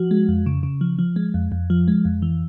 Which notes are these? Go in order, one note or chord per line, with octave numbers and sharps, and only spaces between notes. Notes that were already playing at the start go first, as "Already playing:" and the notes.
Already playing: F3 F#4
G#3
F2
C#3
C#3
F3
F3
G#3
F2
F2
F3
G#3
F2
E3